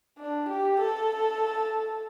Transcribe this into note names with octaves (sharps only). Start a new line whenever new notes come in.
D4
G4
A4